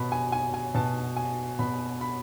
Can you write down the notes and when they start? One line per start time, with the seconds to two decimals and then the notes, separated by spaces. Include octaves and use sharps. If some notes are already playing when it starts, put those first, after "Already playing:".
Already playing: B2 B5
0.12 G#5
0.32 G#5
0.54 G#5
0.75 B2 A5
1.17 G#5
1.59 B2 B5
2.01 B5